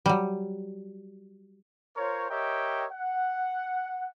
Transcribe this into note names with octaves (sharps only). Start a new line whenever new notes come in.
F#3 G3
F4 A#4 C5 C#5
G4 A#4 C#5 D#5 E5 G5
F#5